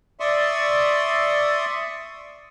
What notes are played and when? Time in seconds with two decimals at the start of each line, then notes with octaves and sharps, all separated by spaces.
0.20 D5 E5 C6 C#6 D#6